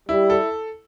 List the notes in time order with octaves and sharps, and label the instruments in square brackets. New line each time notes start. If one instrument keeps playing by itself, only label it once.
[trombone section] G3 [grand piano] E4
[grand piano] A4